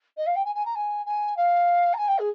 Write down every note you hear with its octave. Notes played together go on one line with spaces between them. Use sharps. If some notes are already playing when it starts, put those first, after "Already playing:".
D#5
F5
G5
G#5
G#5
A#5
G#5
G#5
F5
A#5
G#5
G5
G#4